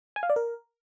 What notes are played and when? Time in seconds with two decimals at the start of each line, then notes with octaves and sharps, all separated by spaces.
0.16 G#5
0.23 F5
0.30 D5
0.36 A#4